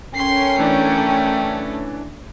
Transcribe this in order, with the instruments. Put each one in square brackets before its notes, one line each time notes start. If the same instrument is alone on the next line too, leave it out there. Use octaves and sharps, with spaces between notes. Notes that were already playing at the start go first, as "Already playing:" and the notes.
[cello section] C#4 [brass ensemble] A4 A#4 G5 [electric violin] C6 C7
[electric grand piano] E3 D4 D5 [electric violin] A3